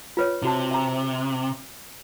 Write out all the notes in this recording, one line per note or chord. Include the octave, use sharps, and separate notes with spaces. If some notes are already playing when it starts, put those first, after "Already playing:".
F4 B4 C#5
C3 E4 F#4 A5
E5 A#5